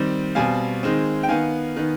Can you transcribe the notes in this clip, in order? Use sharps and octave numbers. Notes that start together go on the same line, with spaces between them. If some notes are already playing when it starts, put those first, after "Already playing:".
Already playing: D#3 G3 C4
B2 G3 C4 F5 G#5
D#3 G#3 C4
G5
D#3 B3 F5 G#5
D#3 B3